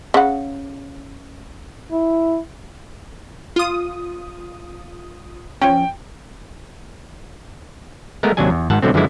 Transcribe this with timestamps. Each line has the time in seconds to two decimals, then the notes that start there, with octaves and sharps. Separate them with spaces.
0.14 C#3 F#5
1.91 E4
3.56 F4 D#6
5.61 F3 C#4 G5
8.23 G#3 A3 B3 A#4
8.37 D#2 C3 F#3 D4 G#5
8.50 E2
8.70 G#1 G#2 F#5 A5
8.82 B2 D3 F#3 A3 C4
8.94 F#2 D3 E3 F3 G#3 E4